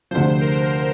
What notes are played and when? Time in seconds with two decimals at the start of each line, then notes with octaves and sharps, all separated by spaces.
0.11 D2 C3 F3 C5
0.30 C5
0.41 A#4
0.48 C5